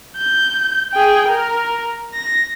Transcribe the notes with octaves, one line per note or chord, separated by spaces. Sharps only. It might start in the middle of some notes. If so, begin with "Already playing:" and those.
G6
G#4 G5
A#4
A#6